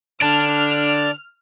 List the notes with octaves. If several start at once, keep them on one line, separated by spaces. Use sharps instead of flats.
D3 D5 A5 F6